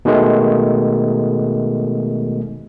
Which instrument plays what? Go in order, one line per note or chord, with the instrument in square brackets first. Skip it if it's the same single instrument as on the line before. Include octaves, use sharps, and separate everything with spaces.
[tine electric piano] B2 D#3 G#3 A3